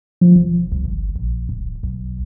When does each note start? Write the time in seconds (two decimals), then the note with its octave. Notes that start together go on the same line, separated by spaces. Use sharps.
0.21 F3
0.36 E1
0.72 C2
0.85 G1
1.15 A#1
1.49 D1
1.83 B1